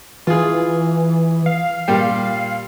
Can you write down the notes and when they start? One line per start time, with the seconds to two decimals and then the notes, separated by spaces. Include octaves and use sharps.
0.27 E3 F4 G#4
1.46 F5
1.88 A#2 G3 G5